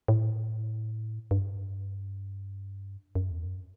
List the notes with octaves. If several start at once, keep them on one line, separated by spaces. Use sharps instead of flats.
A2
G2
F#2
E2
F#2